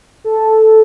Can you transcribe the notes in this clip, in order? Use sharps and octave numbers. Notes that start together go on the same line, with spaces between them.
A4